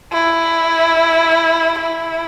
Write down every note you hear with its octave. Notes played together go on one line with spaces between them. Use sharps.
E4
E4